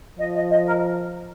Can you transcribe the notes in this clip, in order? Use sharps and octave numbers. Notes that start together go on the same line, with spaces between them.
F3 D#5
D#5
D#5
A#4